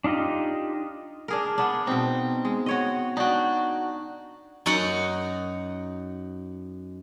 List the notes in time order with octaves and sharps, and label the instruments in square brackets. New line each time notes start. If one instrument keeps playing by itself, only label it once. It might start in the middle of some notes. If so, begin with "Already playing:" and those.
[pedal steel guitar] D4 D#4 F4 G4 D#5
[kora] D4 G#4 A#4
B3 D4
[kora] B2 D#4 [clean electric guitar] C4
[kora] G#3
F#4 C#5 D#5
[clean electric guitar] D4 F#4 [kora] D#4 G5
[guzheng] F#2 D#4 F#4 F#5